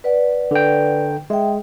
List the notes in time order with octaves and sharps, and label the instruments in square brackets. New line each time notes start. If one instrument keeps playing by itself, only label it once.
[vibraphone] B4 D5 F#5
[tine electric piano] D3 G5
[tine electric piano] G#3 [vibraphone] E5 G5